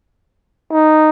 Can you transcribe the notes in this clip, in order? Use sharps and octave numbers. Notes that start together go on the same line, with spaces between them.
D#4